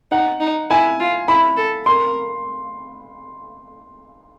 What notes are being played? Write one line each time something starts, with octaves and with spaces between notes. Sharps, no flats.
D#4 F#5
D#4
E4 G#5
F4
E4 B5
A4
A#4 C6